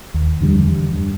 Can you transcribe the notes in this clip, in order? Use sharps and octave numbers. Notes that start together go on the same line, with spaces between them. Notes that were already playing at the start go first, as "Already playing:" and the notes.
D#2
F2 D3 F3 G3
E2
G2